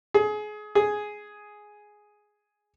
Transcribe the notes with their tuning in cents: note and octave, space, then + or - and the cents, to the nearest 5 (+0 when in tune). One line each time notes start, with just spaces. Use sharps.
G#4 +25
G#4 +5